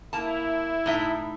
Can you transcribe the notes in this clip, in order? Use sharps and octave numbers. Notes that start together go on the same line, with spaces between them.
A#3 E4 A5
A2 D#4 E5